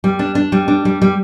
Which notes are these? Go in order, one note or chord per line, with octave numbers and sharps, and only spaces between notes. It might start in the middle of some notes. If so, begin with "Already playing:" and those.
G3
D4
D4
G3
D4
G3
G3